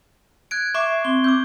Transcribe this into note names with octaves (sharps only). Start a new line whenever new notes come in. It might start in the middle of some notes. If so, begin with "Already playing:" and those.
F#6 G#6 D7
E5 C#6 D6 C7
C4 G7
D6 E6 G6